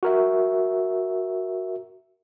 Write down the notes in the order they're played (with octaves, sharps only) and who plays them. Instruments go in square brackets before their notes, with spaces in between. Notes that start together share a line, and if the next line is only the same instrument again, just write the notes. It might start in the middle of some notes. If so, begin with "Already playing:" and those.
[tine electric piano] F#4 A#4 E5